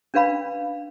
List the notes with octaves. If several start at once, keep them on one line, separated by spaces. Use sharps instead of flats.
C#4 D4 B4 F5 B5